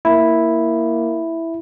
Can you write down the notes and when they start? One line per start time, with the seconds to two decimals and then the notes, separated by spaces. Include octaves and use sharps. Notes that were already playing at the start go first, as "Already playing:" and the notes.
0.05 A#3 E4